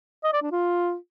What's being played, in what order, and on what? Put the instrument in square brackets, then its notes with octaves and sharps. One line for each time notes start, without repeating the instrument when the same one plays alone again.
[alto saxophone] D#5
D5
D4
F4